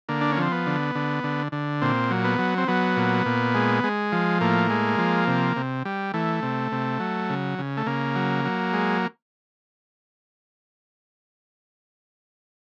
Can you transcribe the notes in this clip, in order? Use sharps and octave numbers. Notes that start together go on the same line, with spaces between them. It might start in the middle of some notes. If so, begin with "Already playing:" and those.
D3 A#3
D4
C#4
F3 C4
B3
D3
D3
D3
D3
A#2 C4
F#3
B3
F#3
C4
F#3 B3
A#2
A#2
G#3
G#3
F3
A2 A#3
G#3
F3
C3
C3
G3
E3 A3
C3
C3
F#3
C#3
C#3
A3
C#3 A#3
F#3
F#3
G#3